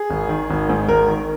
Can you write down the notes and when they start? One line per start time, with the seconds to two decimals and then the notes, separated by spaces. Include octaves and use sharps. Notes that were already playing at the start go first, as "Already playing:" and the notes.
Already playing: G#4
0.10 G#1
0.29 D#3
0.50 G#1
0.69 G#2
0.88 G#1 A#4
1.08 D#3